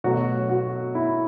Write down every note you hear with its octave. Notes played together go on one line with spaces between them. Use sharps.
B2 F#3 A3 F#4
F#4
E4